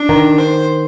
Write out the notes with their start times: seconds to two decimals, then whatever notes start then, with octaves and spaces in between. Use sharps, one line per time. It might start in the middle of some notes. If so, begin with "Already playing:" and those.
Already playing: D4
0.09 D#3
0.38 C5